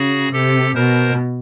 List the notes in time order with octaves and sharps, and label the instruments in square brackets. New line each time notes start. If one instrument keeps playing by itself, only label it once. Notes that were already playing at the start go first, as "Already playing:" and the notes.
Already playing: [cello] C#3 [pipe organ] F#4 G#4
[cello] C3 [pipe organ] G4 A4
[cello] B2 [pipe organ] A#4 C5